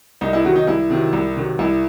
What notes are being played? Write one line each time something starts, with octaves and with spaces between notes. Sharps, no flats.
C2 D#4
E4
C3 D#3 F#3 F#4
D#4
C2 E4
C3 D#3 F#3
C2
C3 D#3 F#3
C2 E4